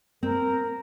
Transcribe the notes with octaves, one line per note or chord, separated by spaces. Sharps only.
C4 A#4